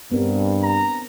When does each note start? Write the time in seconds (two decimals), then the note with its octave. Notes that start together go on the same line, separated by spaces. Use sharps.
0.12 G2 B3 C4 A#4
0.63 A#5